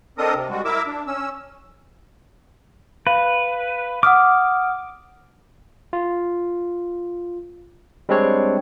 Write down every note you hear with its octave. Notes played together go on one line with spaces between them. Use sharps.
C4 D4 A4 A#4 D#5 D#6
C3
G3 G#3 F#4
E4 A#4 E5 D6 E6
D4
C#4 E6
B4 F5
F#5 D6 D#6 F6
F4
G3 G#3 C4 D4 C#5